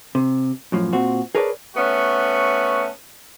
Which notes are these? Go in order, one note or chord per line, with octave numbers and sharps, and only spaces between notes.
C3
F#2 A2 F3
A#2 C4 F#4
G#4 A#4 B4 C#5 D5 A5
A3 B3 C#4 F#4